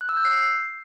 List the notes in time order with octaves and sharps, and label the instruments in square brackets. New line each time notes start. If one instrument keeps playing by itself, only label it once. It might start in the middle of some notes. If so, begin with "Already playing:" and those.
[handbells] F#6
E6
G6
C7